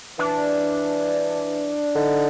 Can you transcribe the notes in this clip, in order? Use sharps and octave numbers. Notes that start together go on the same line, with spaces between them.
E3 D4
D3 D#4